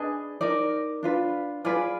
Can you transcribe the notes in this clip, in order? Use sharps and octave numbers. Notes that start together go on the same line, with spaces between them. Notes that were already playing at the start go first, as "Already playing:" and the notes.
Already playing: D4 G#4 B4 D#5
D#4 A#4 D5
D4 F4 B4
F4 G#4 B4 D5